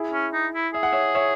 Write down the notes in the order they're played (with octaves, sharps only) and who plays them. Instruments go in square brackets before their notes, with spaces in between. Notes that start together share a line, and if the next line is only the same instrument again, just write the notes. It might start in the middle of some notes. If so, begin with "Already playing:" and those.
Already playing: [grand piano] E4 G#4
[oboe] C#4
D#4
E4
[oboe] G#4 [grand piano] E5
[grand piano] F#5
C#5 E5
C#5 E5